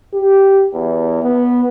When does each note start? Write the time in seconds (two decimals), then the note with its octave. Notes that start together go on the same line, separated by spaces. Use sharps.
0.14 G4
0.74 E2
1.23 B3